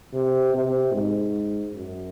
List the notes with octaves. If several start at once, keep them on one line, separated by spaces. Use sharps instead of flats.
C3
C3
G#2
F#2